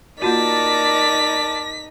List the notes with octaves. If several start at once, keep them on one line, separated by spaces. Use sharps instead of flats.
A#3 D#4 F4 F#4 A#4 D5 A5 B6